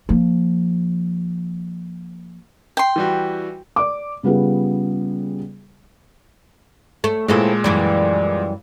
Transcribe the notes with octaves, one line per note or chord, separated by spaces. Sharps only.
F3 A#3
G5 C6
E3 G3 F#4
D5 D6
C#3 G3 B3 F4 G#4
A3
A#2 G#3 C4 E4 A4
F#2 E3 G3